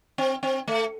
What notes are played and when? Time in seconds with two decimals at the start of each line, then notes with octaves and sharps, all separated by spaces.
0.18 C4
0.43 C4
0.68 A3